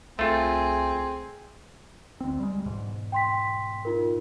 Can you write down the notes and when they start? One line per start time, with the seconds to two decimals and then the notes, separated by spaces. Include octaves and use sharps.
0.19 C2 A3 C4 F4 G#4
2.21 D2 C4
2.40 G3 G#3
2.66 E2 G#2 B2
3.12 G5 C6 B6
3.85 D#4 F4 A#4